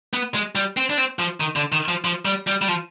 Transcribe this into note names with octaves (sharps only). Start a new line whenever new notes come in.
B3
G#3
G3
C4
D4
C4
F3
D#3
D3
D#3
F3
F3
G3
G3
G3
F3